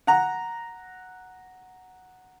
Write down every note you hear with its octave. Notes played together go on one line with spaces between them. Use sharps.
F#5 A#5